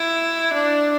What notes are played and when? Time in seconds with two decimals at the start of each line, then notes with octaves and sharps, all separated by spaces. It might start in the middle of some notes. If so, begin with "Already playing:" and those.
Already playing: E4
0.53 D4